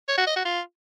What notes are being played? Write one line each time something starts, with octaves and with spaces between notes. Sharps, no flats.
C#5
F#4
D#5
F#4
F4